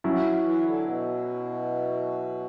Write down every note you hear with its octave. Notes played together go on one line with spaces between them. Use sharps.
F#3 C#4 E4
E3
D3
B2